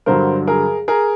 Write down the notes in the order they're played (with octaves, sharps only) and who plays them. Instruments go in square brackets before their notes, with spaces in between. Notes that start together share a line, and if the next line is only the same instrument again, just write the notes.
[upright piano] G2 D3 F#3 A#4 C5
G#4 A#4
G#4 A#4